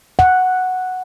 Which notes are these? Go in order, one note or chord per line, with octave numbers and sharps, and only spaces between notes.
F#5